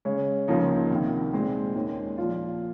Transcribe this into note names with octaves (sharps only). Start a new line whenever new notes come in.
C#3 G#3 C#4
C#2 C#3 F3 A#3 D#4
C2 C3 D#3
A#2 G#3 C4
D#2 D#3 G#3 C#4
A#2 F3 A#3 F4